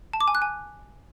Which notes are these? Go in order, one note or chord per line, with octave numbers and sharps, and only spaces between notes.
A5
D6
G#5
F#6
G#5